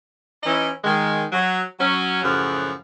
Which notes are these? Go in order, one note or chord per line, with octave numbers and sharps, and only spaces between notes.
E3 C#4 D#4 E4 D#5
D#3 G#3
F#3
F#3 C#4
F#2 A2 C#3 F3 F#3